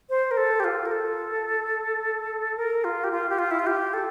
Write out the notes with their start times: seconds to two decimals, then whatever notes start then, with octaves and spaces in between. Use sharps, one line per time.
0.10 C5
0.31 A#4
0.37 A4
0.60 G4
0.64 F4
0.85 A#4
0.92 A4
2.57 A#4
2.84 F4
3.04 G4
3.11 F4
3.29 G4
3.39 F4
3.51 E4
3.59 F4
3.66 G4
3.93 A4